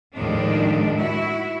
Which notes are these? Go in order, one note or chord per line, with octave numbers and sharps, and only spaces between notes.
D#2 A2 D#3 F3 G#3 D4
E4 F#4